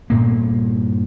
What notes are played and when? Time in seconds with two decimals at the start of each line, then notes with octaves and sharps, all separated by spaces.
0.10 G2 A#2 A#3